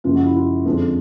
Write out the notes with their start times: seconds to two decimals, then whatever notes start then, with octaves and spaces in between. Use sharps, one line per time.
0.04 F#2 C#3 F3 G#3 F4
0.15 F#4
0.25 E4
0.35 F4
0.66 F2 D3 F3 G#3